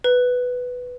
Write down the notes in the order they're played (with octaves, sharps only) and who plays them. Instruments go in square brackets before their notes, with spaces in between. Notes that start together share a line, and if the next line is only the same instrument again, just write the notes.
[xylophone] B4